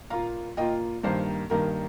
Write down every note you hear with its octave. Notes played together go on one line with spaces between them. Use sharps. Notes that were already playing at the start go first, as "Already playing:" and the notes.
A#2 A#3 F4 F5 A#5
A#2 A#3 F4 D#5 G5
G2 D#3 A#3 C5
G2 D#3 A#3 A#4